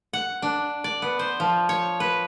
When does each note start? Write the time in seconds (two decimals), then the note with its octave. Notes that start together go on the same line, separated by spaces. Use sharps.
0.13 F#5
0.42 D4
0.84 D5
1.02 B3
1.19 C5
1.40 F3
1.69 C#5
2.00 B4